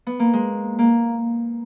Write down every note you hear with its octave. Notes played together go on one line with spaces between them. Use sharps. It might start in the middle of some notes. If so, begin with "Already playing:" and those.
B3
A#3
G#3
A#3